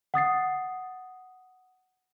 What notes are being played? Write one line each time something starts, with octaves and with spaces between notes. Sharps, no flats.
F#5 D#6 A6 C7